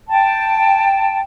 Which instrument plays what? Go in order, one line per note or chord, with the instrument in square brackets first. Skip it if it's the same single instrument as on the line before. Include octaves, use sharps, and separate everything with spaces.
[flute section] G5 A5